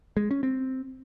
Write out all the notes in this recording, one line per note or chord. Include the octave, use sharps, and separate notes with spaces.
G#3
C#4
C4